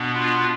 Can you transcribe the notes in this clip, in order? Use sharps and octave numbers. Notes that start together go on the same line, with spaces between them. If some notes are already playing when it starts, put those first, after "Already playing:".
Already playing: B2 B3 D4
F4